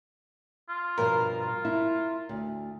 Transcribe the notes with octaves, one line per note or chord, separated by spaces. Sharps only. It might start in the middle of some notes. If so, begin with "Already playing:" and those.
F4
G2 B2 F3 A#4
F4
E4
D2